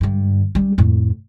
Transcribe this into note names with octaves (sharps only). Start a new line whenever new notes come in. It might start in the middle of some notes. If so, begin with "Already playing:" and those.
G2 D3
G3 C#4
F2 A2